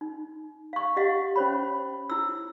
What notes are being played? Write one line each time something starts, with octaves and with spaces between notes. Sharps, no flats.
D#4
F5 C#6
G4 D#5 F5 F#5
C#4 C5 C#5 B5
E4 E6